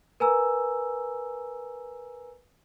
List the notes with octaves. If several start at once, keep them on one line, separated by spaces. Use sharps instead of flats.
A#4 B4 G#5 A#5 E6